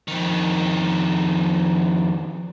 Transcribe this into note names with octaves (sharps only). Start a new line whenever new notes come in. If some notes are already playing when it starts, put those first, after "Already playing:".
F2 D#3